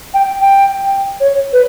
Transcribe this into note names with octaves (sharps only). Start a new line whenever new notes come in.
G5
G5
C#5
B4